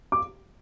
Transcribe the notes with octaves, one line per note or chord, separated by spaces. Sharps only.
D6